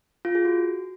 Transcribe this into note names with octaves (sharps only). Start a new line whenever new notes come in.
F4
G#4
F#4